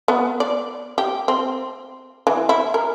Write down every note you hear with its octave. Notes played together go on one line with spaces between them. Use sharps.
B3
D5
G4
C4
E3
E4
A#4